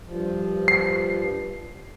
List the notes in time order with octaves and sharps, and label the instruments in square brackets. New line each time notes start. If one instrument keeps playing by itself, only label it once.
[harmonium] G2 F3
[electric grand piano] C7